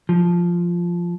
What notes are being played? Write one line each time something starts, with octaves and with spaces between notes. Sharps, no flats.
F3